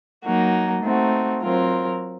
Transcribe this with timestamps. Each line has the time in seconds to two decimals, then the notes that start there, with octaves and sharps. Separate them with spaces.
0.25 F#3 A#3 D#4 F#4
0.82 A3 C4 D#4 F#4
1.41 F#3 C4 F4 A#4